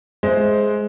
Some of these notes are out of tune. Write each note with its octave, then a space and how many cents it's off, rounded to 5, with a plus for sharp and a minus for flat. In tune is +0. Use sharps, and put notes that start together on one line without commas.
G#3 +10 C5 +0 E5 +0